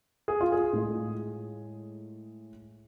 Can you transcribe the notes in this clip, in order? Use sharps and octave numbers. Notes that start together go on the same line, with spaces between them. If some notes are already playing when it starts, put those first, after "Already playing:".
G#4
F4
G#4
A2 G#3